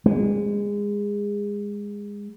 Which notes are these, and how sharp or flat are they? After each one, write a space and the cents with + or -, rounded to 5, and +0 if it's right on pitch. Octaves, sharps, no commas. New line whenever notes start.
G#3 -25